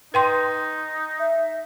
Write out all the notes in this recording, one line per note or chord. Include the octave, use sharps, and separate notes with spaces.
D#4 B4 G5 C6
E5